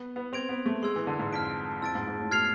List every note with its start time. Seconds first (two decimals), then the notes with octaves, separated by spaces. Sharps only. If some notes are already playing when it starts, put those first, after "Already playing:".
Already playing: B3
0.16 B3
0.33 C4 C6 G#6 D7 F7
0.49 B3
0.66 A3
0.82 G#3 C6 E6 G#6
0.96 E3
1.07 D3
1.20 G#2
1.33 F2 F6 B6 D7
1.82 F2 E6 A6 D7
1.95 G#2
2.08 G#2
2.20 A2
2.31 B2 F6 G#6 C7 F7